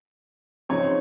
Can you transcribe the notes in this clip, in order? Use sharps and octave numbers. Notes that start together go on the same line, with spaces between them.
C#3 F3 C4 D#4 C#5